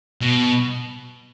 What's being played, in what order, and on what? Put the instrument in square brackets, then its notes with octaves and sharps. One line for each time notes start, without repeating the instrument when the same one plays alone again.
[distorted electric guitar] B2